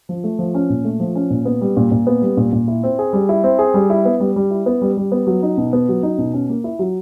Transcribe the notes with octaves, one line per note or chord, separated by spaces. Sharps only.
F3
A3
F3
C#4
A#2
A3
F3
C#4
A#2
B3
G3
A#2
A#2
B3
G3
A#2
A#2
E4
C4
G#4
G3
E4
C4
G#4
G3
E4
B3
G3
G3
E4
B3
G3
G3
B3
F#3
D#4
B2
B3
F#3
D#4
B2
C#4
A#3
E4
F#3